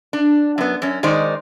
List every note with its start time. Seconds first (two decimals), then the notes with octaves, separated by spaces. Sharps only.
0.13 D4
0.58 F#2 B3
0.82 F#2 C#4
1.03 D#3 G#3 D#4 C5 D5